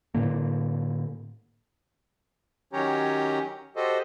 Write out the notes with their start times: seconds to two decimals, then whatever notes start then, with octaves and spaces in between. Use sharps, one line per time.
0.14 A2 D3 A#3
2.73 D#3 F#3 C#4 G4 C#5 A#5
3.76 F#4 G4 A4 C5 D#5